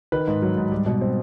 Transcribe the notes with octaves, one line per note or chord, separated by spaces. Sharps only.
D#3 B4
G#2
F#3
G#2
G3
B2
C4